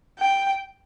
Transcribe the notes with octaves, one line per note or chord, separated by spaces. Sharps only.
G5